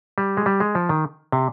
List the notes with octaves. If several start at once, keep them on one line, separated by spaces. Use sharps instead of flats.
G3
G#3
G3
G#3
F3
D#3
C3